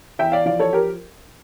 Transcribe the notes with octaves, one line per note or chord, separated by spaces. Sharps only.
E2 E5 G5
D5 F5
F3 D5 F5
A4 C#5
G4 A#4